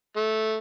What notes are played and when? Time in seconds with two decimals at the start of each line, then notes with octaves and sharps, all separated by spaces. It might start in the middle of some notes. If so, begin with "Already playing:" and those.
0.17 A3